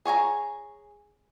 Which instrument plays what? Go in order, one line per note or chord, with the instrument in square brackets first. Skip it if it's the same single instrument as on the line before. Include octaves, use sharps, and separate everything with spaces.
[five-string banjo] G#4 C#5 G#5 A#5